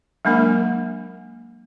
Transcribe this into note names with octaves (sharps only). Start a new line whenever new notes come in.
F#3 G#3 A#3 D4 A#4